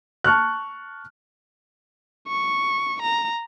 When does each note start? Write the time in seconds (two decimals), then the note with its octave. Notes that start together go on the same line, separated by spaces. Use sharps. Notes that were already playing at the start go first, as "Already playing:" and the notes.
0.24 A5 C#6 F6 F#6
2.28 C#6
3.02 A#5